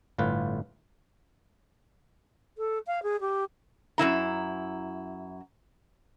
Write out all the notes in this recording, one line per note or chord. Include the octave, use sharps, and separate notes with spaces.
G1 A2 F4 B4
A4
F5
G#4
G4
F#2 C#3 E4 A#5